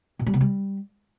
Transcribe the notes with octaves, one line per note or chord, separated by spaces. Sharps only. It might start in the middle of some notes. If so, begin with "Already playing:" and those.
A#2
G3
C3
G3